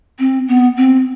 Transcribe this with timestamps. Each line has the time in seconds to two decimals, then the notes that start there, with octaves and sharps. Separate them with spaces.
0.19 C4
0.48 B3
0.77 C4